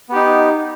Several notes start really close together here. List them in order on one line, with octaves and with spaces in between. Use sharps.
B3 G4 D#4